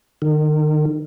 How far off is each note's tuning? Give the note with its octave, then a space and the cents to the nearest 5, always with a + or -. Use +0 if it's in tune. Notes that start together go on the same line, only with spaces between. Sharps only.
D#3 -35